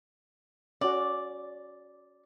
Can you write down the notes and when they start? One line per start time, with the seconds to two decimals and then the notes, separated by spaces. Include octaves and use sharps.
0.81 C#4 F#4 D5